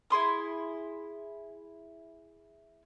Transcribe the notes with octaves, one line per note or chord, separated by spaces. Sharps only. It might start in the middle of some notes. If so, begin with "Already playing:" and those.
E4 G#4 C6 D#6